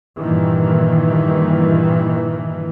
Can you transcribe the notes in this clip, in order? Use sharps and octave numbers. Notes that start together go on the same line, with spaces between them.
G2 A#2 D#3 E3